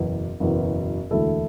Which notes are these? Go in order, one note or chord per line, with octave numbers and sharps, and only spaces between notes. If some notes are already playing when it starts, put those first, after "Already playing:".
Already playing: F#1 E2 B2 F#3
F#1 E2 B2 F#3
E1 D2 D3 E4 A4